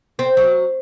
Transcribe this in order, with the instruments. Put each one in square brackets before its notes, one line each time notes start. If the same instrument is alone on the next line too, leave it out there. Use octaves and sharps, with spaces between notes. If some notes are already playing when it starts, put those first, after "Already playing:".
[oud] C4
F#3